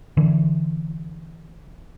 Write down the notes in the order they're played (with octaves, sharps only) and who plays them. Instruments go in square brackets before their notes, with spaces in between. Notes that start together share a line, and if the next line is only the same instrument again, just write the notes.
[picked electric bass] D3 E3